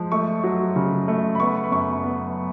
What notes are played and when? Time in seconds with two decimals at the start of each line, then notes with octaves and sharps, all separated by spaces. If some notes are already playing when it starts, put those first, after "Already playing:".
Already playing: F3 G#3
0.12 A3 C#6
0.44 F#3
0.76 C#3
1.08 A3
1.35 B5
1.40 B3 C#6
1.64 B5
1.72 F#2 C#6
2.04 B3